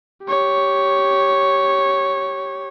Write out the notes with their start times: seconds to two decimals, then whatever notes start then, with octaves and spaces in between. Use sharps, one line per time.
0.25 G4 C#5